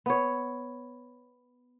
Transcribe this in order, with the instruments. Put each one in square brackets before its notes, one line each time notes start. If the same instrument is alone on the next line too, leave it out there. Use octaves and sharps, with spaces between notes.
[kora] B3 C#5